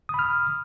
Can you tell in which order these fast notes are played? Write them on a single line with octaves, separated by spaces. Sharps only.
D#6 B5 F6